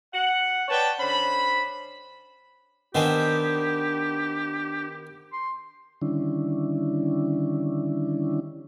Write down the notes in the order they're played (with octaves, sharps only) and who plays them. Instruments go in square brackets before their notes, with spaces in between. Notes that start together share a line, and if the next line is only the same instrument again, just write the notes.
[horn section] F#5
B4 C#5 D5 F#5 G5 A5
D3 C#4 C5 B5
[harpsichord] D#3 B3 C4 [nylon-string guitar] D4 G#5 [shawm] G4
[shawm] C6
[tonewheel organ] D3 D#3 G3 C#4 D4 E4